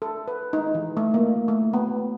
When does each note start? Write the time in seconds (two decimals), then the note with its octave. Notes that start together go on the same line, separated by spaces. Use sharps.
0.02 A4
0.28 B4
0.53 D#4
0.75 E3
0.97 A3
1.14 A#3
1.48 A3
1.73 B3